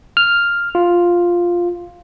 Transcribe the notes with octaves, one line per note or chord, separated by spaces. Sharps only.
F6
F4